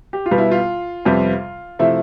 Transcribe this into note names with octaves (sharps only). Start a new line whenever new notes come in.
G4
F4
B2 G3 B3
E4
F4
F2 C3 G3 B3
C3 F3 A3 E4